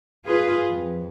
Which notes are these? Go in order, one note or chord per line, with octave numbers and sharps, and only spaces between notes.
F4 G#4 B4
F2